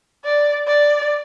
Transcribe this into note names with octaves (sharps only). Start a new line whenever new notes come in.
D5
D5